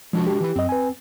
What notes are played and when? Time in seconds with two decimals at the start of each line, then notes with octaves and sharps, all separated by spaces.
0.13 F3 G#3 D4 F#4
0.27 G4
0.40 E3 E4
0.56 F#2 C4 D#5
0.69 B4 G#5